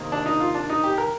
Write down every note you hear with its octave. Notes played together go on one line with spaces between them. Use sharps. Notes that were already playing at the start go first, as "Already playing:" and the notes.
Already playing: C3 D#3 A#3
D4
D#4
F4
D4
D#4
G4
A#4